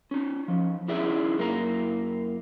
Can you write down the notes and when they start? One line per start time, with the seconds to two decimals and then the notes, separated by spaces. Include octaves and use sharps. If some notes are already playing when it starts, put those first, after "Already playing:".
0.11 C#4 D#4
0.48 F3 C#4
0.88 C#4 D#4 E4 G#4 D5 E5
1.38 F#2 A#3 E4 F4 A#5